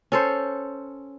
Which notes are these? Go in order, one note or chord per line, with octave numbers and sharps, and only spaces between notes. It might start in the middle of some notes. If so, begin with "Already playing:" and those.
C#4 A4 C5